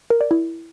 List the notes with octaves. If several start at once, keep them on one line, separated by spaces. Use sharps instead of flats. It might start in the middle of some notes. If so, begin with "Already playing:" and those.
A#4
D5
E4